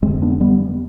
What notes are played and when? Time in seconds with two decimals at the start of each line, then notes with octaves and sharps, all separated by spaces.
0.02 F2 G#3 C4
0.07 D3
0.22 B3 D4
0.41 G3 B3